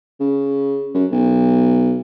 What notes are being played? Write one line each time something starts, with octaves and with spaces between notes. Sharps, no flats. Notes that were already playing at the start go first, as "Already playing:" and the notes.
C#3
F#2
B1